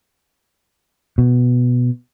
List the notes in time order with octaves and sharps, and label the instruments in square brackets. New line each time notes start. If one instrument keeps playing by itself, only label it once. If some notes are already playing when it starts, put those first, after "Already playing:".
[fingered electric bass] B2